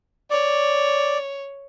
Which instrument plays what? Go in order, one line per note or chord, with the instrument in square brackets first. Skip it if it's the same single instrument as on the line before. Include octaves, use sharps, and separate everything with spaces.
[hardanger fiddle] C#5 [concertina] D5